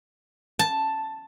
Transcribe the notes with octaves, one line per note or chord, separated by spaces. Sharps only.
A5